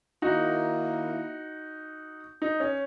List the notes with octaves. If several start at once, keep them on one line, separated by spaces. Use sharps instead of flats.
D#3 A#3 D#4 E4 F#4
D#4
C#4